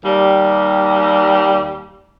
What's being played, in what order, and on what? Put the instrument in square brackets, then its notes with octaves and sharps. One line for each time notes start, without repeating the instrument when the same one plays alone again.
[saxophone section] D#2 G3